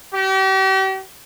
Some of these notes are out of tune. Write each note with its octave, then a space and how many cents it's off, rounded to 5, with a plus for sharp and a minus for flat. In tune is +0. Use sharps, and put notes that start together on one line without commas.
G4 -40